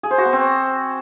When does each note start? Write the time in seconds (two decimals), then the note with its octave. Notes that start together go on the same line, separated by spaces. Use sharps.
0.03 G#4
0.11 C5
0.18 F#4
0.25 B3
0.33 C4